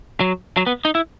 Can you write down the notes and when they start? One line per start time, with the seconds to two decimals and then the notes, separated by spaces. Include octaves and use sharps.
0.21 F#3
0.57 F#3
0.67 B3
0.85 D#4
0.95 E4